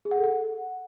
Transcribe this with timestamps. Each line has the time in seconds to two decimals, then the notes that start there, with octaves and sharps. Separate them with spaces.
0.05 G#4
0.11 F#5
0.18 A4
0.24 F#5